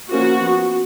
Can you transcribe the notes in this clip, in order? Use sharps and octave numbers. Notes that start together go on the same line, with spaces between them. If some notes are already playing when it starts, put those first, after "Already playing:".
F3 A#3 C#4 F#4
F3 B3